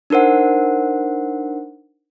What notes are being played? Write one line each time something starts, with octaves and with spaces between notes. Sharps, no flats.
D4 D#4 A#4 C5 F#5